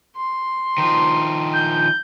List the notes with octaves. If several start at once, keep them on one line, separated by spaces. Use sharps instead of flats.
C6
D#3 F3
G6